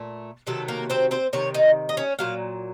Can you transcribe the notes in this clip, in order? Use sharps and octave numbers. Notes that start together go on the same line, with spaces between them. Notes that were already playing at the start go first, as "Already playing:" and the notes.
Already playing: A#2 A3
C3 D#3 F#3 A3 A4
A#3 A#4
C4 C5
C4 C5
C3 D#3 C#5
D#4 D#5
D#5
C#4 C#5
A#2 F#3 F5